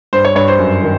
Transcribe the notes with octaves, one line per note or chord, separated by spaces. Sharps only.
G2 C5
C#5
G2 C#5
C5
F#2
D#3